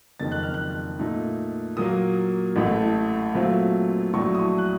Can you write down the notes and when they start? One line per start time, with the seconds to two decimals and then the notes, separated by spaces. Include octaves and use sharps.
0.20 F#1 F2 D#3 A6
0.32 F#6
0.43 F6
0.54 F#6
0.99 A#2 A3 D#4
1.77 A#2 F#3 A#3 D#6
2.56 A1 A2 A3
3.34 A#2 F#3 A3 C4 F4
4.13 A#1 A2 F#3 A3 C#6
4.35 D#6
4.39 C#6
4.58 F#6